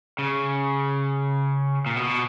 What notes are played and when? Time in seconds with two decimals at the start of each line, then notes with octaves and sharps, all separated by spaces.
0.19 C#3
1.86 A#2
1.96 B2